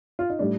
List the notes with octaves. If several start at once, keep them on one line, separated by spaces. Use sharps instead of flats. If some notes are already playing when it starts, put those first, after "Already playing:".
F4
D#4
A2 G3 D4